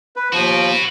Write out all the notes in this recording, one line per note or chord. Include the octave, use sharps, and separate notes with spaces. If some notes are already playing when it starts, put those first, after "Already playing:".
B4
D#2 F3 F#4 B4